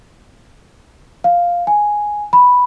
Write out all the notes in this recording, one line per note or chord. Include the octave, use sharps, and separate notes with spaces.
F5
G#5
B5